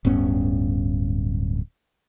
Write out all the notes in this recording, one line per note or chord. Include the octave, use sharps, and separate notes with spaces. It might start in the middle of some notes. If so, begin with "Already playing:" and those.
D1 G2 B3 C#4